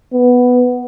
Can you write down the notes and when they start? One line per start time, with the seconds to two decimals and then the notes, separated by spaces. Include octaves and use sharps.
0.13 B3